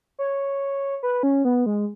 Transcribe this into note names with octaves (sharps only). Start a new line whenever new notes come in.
C#5
B4
C#4
B3
G#3